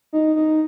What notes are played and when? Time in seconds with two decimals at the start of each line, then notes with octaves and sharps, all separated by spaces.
0.13 D#4
0.36 D#4